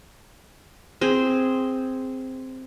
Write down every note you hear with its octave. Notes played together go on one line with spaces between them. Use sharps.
C4 G#4